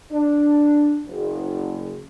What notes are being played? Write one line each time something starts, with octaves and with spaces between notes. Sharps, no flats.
D4
F#1